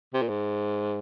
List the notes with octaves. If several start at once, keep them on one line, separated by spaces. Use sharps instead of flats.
C3
A#2
G#2